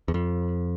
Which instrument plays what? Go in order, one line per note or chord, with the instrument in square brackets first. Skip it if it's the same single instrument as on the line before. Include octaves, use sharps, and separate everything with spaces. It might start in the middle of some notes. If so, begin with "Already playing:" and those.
[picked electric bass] E2
F2